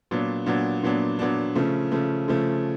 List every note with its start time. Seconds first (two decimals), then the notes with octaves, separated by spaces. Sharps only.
0.11 A#2 F#3 B3 D4
0.46 A#2 F#3 B3 D4
0.83 A#2 F#3 B3 D4
1.19 A#2 F#3 B3 D4
1.55 C#3 F3 A3
1.92 C#3 F3 A3
2.28 C#3 F3 A3